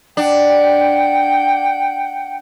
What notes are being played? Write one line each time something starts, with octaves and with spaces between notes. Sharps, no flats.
D4 F#5 G5 G6